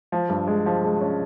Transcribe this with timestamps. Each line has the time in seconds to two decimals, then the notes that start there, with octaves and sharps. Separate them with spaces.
0.12 F3
0.29 G2
0.47 G#3
0.66 F3
0.84 G#3
1.01 C#4